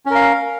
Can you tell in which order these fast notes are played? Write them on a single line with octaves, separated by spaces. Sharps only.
C#4 A#4 F5